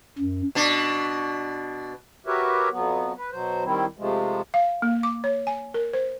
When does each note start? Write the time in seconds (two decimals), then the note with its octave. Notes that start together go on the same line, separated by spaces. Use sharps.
0.19 F#2
0.55 B2 D4
2.26 F#4 G4 A#4 B4 C#5 E5
2.71 F2 F#3 B3
3.18 B4
3.32 B2 F#3 C5
3.64 D#3 G3 C4 E4
3.98 C3 F3 G#3 A3
4.54 F5
4.82 A#3
5.03 D6
5.24 C#5
5.47 G#5
5.74 A#4
5.94 C5